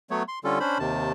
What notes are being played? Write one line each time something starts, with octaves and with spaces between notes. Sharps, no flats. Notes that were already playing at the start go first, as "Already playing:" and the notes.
F#3 A3 B3 C#5
C6
D3 G3 C#4 F4 A4
C#4 D4 C5 B5
D#2 C3 D#3 A5